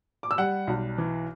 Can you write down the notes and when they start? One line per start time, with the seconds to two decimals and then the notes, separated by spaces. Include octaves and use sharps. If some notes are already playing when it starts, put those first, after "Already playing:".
0.23 D6
0.31 E6
0.38 G3 F#5 F#6
0.67 B1
0.98 E3